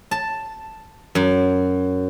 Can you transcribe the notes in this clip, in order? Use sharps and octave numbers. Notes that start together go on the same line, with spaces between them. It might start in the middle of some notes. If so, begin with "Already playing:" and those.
A5
F#2